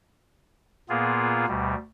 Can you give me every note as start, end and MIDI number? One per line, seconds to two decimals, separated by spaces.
0.89 1.46 46
0.89 1.46 58
0.89 1.46 59
0.89 1.46 65
0.89 1.46 68
1.48 1.75 38
1.48 1.75 47
1.48 1.75 55